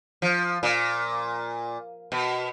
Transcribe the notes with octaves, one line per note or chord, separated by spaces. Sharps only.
F3
A#2
B2